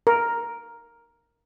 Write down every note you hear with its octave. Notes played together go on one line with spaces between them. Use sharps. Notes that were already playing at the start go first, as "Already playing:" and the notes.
A#4